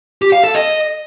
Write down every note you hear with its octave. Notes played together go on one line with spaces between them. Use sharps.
G4
F5
A4
D#5